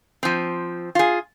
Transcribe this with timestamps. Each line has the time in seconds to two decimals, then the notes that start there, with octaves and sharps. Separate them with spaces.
0.23 F3 C4
0.95 F4 G#4